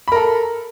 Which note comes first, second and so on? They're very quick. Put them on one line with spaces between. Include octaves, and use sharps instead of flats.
B5 A#4 A4